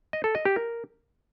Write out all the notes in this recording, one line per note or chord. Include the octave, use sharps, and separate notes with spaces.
D#5
A4
D#5
G4
A#4